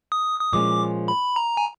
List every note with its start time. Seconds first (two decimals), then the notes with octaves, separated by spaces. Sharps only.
0.12 D#6
0.40 D#6
0.53 A#2 F3 G#3 C#4 D6
1.08 B5
1.36 A#5
1.57 G#5